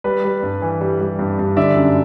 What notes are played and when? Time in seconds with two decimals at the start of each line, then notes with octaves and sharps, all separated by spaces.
0.04 G3 B4
0.24 G3
0.43 G2
0.62 E3
0.81 G3
1.00 G3
1.19 G2
1.39 G2
1.57 D3 D5 E5
1.76 F#2